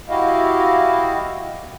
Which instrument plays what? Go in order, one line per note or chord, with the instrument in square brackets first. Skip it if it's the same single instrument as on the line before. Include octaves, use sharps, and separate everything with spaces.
[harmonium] E4 F#4 G4 D#5 F5